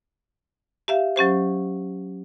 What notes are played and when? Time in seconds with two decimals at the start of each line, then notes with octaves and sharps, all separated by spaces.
0.88 G4 E5 F5
1.16 F#3 C#4 G4 C5